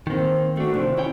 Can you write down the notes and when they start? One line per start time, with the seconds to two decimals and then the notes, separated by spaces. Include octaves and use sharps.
0.07 D#3 A#3 C4
0.57 A3 D4 F#4
0.75 C3 D#3 F3 C4
0.97 C#4 E4 C#5 G5